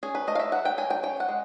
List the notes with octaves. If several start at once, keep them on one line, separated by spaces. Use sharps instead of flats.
C#4 G#4
B4
A3 D#5
F5
E5
F#3 F#5
G5
F#3 G#5
G5
C#4 G5
F#5
G#3